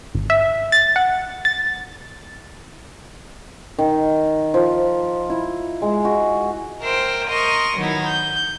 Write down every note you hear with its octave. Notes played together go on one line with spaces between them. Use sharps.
G#1
E5
A6
F#5
A6
D#3
F3
E4
G#3
F#4
A#4 C5 E5 G5
A#4 D#5 C6 C#6
D#3 F#3 B3 D#4 E4
G6